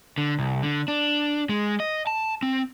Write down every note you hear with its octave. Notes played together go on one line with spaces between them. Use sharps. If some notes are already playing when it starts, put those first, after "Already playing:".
D3
C2
D3
D4
G#3
D#5
A5
C4